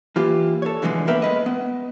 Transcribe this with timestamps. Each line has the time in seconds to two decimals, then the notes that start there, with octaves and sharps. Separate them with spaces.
0.16 E3 A#3 F4 G4
0.62 A4 C#5
0.82 B2 D3 E3 F3 G#3
1.07 A#3 B3 A#4 B4 E5 G5
1.22 G#3 B4 D#5
1.46 B3